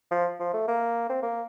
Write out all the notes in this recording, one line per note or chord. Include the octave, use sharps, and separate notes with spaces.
F3
F3
A3
A#3
C4
A#3